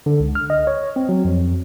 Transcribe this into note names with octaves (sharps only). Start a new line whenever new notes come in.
D3
C#2
F6
D#5
C#5
C4
F#3
F2